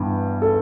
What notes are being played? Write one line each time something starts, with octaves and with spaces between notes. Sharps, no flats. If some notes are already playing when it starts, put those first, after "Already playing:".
Already playing: G2 E3 B3
A4